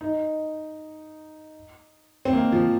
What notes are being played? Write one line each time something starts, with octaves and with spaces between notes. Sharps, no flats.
D#4
C4
A#3
F3